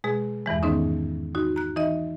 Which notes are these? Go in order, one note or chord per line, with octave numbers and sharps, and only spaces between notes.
B2 G#3 G#4
E2 G2 E3 G#3
G#2 D#3 B3 C#4 D#4
D#4 F#4
A#5 F#6
E3 D#4 D#5